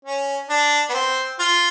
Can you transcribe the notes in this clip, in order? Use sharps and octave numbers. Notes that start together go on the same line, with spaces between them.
C#4
D4
B3
C4
F4